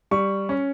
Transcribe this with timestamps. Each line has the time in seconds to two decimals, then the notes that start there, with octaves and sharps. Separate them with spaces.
0.11 G3 C#6
0.49 C#4